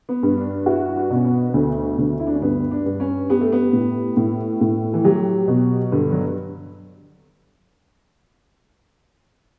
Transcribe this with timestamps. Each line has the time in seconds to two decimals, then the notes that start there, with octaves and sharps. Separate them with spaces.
0.09 B3
0.23 G2
0.37 D4
0.66 E4 F#4
0.88 E4
0.96 D4
1.10 B2
1.15 C#4
1.25 B3
1.49 B3
1.54 D2 A3
1.98 D2
2.20 E4
2.27 D4
2.34 C#4
2.42 G2 B3
2.71 D4
2.86 G2
3.00 C#4
3.30 B3 G4
3.41 A3
3.52 B3
3.73 A2
4.17 A2
4.61 A2
4.94 E3
5.04 F#3 G4
5.48 B2
5.92 G2 D3
6.12 F#3